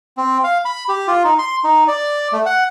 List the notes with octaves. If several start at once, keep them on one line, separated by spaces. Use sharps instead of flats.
C4
F5
B5
G4
F4
D#4
C6
D#4
D5
A3
F#5